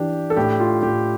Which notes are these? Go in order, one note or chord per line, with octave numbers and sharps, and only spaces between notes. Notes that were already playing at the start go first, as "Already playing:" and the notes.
Already playing: E3 D4 G4
A4
A2 G4
F4
A2 G4